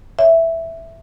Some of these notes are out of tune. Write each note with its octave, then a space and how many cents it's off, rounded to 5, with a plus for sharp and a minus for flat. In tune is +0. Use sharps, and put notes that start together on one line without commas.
C#5 +0 E5 +0